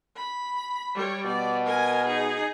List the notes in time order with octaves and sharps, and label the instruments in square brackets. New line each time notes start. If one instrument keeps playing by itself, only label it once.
[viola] B5
G3 C#5
[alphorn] B2 [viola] D5
[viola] A#4 G#5
D#4 G#4